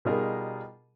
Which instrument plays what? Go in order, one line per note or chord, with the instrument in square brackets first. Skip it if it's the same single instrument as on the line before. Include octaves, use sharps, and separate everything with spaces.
[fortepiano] B2 G3 D#4 F4 G#4 A#4